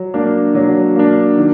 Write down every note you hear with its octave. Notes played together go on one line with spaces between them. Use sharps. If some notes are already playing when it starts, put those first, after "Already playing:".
Already playing: F#3
A#3 D4
F#3
A#3 D4
D#3